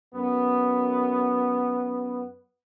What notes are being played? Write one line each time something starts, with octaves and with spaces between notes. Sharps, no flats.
F#2 B3